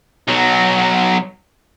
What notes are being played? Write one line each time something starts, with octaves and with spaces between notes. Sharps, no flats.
B1 F#3